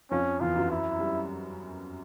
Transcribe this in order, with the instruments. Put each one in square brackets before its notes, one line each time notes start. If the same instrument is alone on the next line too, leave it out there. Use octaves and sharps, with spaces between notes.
[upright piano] F2 F3 [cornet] C#4
[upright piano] E2 E3 [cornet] F4
[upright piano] F#2 F#3
[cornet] E4
[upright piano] G3